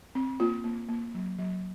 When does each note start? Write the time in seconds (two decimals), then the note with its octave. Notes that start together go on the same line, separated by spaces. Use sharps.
0.15 C4
0.40 A#3 F4
0.64 A#3
0.89 A#3
1.15 F#3
1.38 F#3